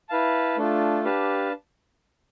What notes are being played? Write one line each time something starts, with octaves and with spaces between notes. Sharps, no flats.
E4 B4 F5 A5
A3 D4 F4
D4 G4 B4 F5 A5